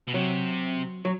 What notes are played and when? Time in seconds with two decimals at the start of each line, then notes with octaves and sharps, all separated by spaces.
0.08 B2
0.14 C3 F#3
1.05 F#3